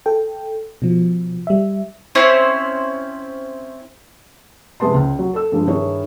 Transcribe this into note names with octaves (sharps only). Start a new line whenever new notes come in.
A4 G5
B2 F3
G3 E5
C4 C#4 E4 C5
F2 C3 G#3 B3 A5 C6
C#2
F#3
A4 E6
G2 F3 G#3
G2 D#3 E4 G#4 C#5